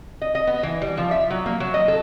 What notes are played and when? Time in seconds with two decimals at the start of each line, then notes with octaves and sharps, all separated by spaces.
0.22 D#5
0.35 D#5
0.47 B3
0.63 E3
0.82 G3
0.97 F3
1.11 E5
1.30 F#3
1.46 A#3
1.60 F#3
1.74 D#5
1.88 A4